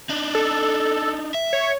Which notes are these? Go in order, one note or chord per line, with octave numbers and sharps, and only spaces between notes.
D4 D#4
A4
E5
C#5